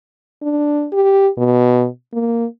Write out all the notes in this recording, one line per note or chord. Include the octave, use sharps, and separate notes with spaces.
D4
G4
B2
A#3